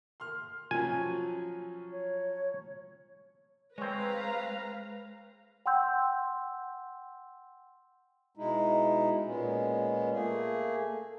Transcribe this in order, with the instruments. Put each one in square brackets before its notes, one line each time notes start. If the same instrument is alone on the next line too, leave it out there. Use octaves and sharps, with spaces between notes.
[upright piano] C6 F6
[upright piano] F3 F#3 C#4 [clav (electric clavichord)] G#5
[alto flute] C#5
[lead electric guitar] G#3 [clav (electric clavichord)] C4 C#5 [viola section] B4 F5 A#5
[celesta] F#5 G5 C6 E6 G6
[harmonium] B2 G#3 D#4 E4
A#2 G#3 B3 C#4
A3 A#3 G#4